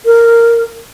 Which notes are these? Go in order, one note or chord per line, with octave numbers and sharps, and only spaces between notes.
A#4